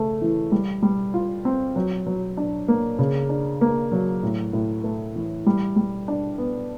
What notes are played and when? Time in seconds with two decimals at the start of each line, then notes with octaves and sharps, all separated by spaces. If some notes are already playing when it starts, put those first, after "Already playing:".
Already playing: C#3 A3
0.22 E3
0.52 G3
0.82 G3
1.14 F4
1.45 C4
1.76 F#3
2.07 F#3
2.37 D4
2.68 A#3
2.99 C#3
3.29 D4
3.61 A#3
3.92 F#3
4.23 A2
4.53 A2
4.84 A3
5.16 E3
5.46 G3
5.76 G3
6.08 D4
6.38 B3